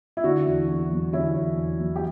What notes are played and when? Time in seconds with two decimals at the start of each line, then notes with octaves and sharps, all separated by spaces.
0.17 E4
0.24 D3 D4 F#4
0.46 E2
0.68 E2
0.91 F#3
1.13 D3 C#4 E4
1.36 E2
1.57 E2
1.80 F#3
1.96 G4